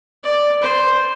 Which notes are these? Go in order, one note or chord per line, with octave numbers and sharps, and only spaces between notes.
D5
C5